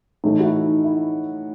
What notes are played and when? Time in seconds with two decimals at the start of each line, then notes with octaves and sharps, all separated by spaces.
0.24 A2 E3 A3 D#4
0.40 F#4
0.43 E4
0.64 D#4
0.84 E4